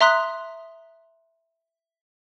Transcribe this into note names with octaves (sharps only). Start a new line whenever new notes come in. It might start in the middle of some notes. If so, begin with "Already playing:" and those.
E5 A#5 C6 D#6 F#6 B6